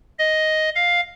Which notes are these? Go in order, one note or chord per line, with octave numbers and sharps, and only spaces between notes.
D#5
F5